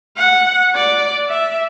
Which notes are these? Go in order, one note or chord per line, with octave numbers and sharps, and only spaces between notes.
F#5
D5
E5